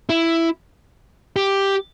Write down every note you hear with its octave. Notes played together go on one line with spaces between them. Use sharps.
E4
G4